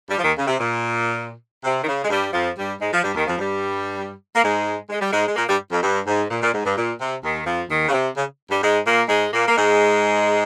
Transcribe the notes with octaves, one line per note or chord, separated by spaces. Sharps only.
G2 G3
F3
D#2 D#3
C#3
C3
A#2
C3
D#3
C#3
G#3
G2 G3
F2 F3
G2 G3
G#2 G#3
F3
G2 G3
D#2 D#3
F2 F3
G2 G3
A#3
G#2 G#3
G#3
G3
G#2 G#3
G#3
A#2 A#3
G2 G3
F2
G2
G#2
A#2
A#2
G#2
G2
A#2
C3
D#2 D#3
F2 F3
D#2 D#3
C#3
C3
C#3
G2 G3
G#2 G#3
A#2 A#3
G#2 G#3
A#2 A#3
A#3
G#2 G#3